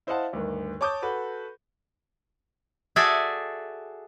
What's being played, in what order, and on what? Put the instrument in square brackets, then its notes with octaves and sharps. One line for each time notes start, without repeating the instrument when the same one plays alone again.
[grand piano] E4 C5 D#5 F5 F#5 A5
D2 G2 D#3
C#5 A5 D6 D#6 G6
F#4 A4 B4
[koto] F#4 G#4 A4 D5 E5 G#5